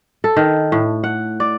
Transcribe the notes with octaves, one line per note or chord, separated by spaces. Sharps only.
A4
D#3
A2
F#5
D5